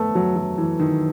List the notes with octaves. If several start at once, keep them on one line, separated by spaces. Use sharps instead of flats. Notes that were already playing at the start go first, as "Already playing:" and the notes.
Already playing: A3 B3
F#3
F#3
E3
D#3